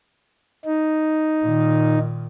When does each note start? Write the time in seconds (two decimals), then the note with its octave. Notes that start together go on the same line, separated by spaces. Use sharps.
0.65 D#4
1.43 A#2 D#3